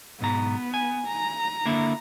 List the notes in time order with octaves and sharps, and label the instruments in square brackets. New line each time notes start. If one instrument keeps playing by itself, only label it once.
[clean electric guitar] B1 G#2 A#5 [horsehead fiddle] B3
[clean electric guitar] G#5
[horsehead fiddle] A#5
[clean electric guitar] D3 A#3 E4